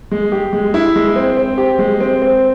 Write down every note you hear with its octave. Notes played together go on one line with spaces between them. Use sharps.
G#3
G4
G#3
E4
G#3
C4
C4
G4
G#3
C4
C4